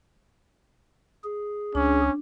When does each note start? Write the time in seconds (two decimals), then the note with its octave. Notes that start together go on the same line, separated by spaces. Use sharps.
1.24 G#4
1.75 C#2 C#4 D4